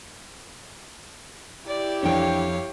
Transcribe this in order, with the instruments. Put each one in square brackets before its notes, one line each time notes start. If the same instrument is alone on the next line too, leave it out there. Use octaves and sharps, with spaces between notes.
[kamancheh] E4 G4 [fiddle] D5
[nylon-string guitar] F2 G5 [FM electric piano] E3 D4 [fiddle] C#5 F5